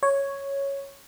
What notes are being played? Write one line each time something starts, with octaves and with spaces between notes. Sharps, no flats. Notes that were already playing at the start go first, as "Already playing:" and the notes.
C#5